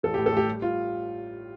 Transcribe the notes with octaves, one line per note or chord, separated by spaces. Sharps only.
A1 A4
A2 G4
A4
A3 G4
G3
G3 F4